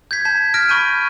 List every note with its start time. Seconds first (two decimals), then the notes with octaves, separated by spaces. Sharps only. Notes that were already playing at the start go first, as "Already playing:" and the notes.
0.11 G6 G#6 B6
0.25 A5 G#6 B6
0.54 F6 A#6 D7
0.69 B5 C#6 G6 D#7